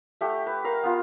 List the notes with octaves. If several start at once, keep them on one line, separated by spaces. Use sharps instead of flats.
A3 G4 F#5
B4
A#4 F5
B3 F4